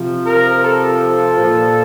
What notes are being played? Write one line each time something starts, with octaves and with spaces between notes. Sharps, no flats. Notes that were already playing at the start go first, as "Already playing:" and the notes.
Already playing: C3 F3
A#4
A4
A#2
F3